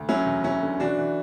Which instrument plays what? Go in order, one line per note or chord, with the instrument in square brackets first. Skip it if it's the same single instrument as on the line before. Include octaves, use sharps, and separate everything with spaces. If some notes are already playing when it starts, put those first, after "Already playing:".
Already playing: [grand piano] D2
F#3 C#4 E4
E2
E2 C#4 E4
D3
E3 D4 F#4
E3